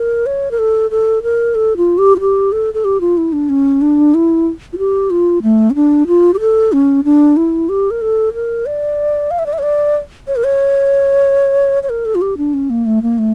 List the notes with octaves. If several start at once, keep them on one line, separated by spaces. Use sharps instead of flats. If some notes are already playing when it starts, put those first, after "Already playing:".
Already playing: A#4
C#5
A#4
A4
A4
A#4
A4
F4
G4
F4
G4
A4
A4
G4
F4
E4
D4
C#4
D4
E4
F4
G4
F4
A3
C#4
D4
F4
G4
A4
C#4
D4
E4
G4
A#4
A4
A#4
D5
F5
E5
D5
E5
C#5
D5
C#5
A#4
C#5
C#5
A#4
A4
F4
G4
D4
C#4
A#3
A3
A#3
A3